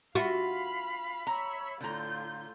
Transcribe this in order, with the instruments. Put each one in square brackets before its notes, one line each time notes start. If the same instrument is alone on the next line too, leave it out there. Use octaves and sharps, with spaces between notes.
[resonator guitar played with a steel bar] F4 E5 [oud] F#4 [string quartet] F5 B5
[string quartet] C#5 E5 B5 [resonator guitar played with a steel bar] A#5
[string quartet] A2 F4 G6 [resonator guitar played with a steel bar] D3 A#5